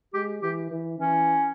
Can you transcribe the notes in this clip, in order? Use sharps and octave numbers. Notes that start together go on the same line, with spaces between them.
G#3 G4
E3 G4
E3
E3 C#4